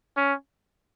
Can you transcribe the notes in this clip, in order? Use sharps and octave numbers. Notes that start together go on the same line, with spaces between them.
C#4